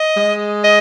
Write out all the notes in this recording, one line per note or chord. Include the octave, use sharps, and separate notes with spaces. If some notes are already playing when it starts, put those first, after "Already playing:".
Already playing: D#5
G#3
D#5